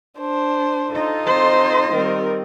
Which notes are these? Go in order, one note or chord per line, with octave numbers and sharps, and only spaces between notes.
D4 C5
D#4 F4 A4 D#5
C4 C5 C6
D#3 G3 C4 D#4 A#4